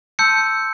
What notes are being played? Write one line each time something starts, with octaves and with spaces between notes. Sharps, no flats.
A5 C6 E6 G6 C#7